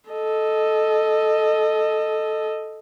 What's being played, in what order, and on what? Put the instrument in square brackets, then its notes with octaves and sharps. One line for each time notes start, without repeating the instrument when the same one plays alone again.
[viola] A4 D#5